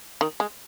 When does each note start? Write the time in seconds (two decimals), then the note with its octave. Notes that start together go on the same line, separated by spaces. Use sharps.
0.21 D#3
0.40 G#3